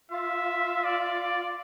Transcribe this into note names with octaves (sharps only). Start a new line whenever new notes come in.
F4 E5 F5
D5